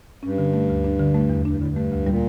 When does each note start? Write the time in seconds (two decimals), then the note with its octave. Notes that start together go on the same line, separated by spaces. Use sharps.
0.23 G2 C#4
0.38 D3
0.53 A3
0.69 D2
0.84 D4
0.99 D3
1.14 A3
1.29 E2
1.45 G2 D4
1.56 A2 D3
1.68 G2
1.76 A3
1.91 D2
2.01 A2
2.06 A#2 G3